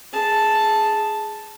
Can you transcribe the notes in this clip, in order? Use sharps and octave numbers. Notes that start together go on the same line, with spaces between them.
G#4 A5